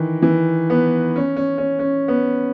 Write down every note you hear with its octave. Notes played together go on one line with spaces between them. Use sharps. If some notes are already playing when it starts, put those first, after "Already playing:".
Already playing: D#3 E3
E3
B3
C#4
C#4
C#4
C#4
B3